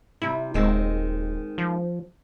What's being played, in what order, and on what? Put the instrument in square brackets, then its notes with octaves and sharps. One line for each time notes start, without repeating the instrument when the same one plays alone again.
[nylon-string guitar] C3 G3 [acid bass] E4
[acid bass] D#1 [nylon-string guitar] D#3 G#3 C4
[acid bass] F3